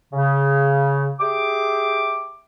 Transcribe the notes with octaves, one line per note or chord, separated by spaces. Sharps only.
C#3
G4 G#4 E5 D6